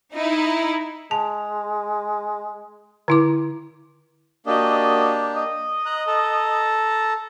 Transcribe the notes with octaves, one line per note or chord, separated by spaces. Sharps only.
D#4 E4
G#3 A5
D3 E4 D6
A#3 D4 F#4 G4 D#5
D#5
A#5 F#6
A4 A5 A#5